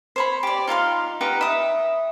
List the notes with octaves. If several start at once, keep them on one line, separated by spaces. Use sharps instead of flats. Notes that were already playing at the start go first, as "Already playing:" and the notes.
C5 C#5 B5
G4 D5
D#4 F4 F5 C6
D#4 G4 B4 F#5
E5 D#6